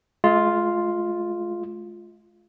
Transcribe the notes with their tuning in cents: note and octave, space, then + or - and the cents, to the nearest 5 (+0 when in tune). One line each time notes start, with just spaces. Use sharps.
G#3 +40 F4 +0